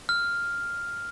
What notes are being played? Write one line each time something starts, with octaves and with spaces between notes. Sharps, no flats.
F6